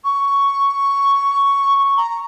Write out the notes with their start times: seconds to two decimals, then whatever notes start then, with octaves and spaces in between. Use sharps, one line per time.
0.04 C#6
1.78 C#6
1.96 A#5